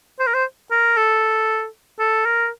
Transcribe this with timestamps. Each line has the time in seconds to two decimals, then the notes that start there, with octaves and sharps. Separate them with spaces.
0.19 C5
0.27 A#4
0.34 C5
0.71 A#4
0.97 A4
2.00 A4
2.25 A#4